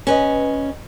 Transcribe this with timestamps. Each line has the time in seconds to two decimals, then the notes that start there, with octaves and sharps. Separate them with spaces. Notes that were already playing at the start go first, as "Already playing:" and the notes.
0.07 C#4 B4 D#5